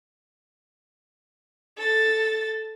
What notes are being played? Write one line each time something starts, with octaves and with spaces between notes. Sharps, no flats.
A4 A6